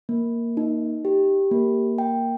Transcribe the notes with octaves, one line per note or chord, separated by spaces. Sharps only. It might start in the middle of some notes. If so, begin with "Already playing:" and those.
A#3
D#4
G4
A#3
G5